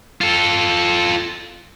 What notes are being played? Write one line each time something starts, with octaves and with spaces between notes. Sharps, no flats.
F4 A4